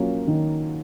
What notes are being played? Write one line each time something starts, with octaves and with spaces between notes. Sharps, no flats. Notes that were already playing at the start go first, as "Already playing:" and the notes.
Already playing: F#3 A#3 C#4 F4
D#3